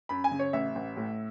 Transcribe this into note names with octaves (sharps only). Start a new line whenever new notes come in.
F#2 B5
G#5
C#3
C#5
A1 E5
A1
A2